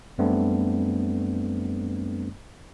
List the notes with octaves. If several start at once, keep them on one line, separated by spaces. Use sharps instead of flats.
F#2 G3 A3 B3 C4 D4